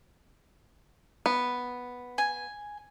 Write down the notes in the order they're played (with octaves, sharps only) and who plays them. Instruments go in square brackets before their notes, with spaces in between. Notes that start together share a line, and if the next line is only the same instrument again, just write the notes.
[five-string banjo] B3
[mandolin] G#5